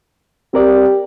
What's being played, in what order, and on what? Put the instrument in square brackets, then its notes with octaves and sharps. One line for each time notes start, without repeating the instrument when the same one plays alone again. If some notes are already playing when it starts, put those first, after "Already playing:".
[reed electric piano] C4 A#4 D5 [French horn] G4